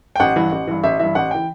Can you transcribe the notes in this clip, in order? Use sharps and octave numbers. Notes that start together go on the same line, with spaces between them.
G5
A1 F#5
G2 E3
A1
G2 E3
A1 E5
G2 E3 E5
A1 F#5
E3 G5